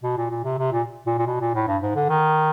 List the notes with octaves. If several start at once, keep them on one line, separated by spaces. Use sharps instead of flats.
B2
A#2
A#2
C3
C3
A#2
A#2
A#2
B2
A#2
A2
G2
G#2
D3
D#3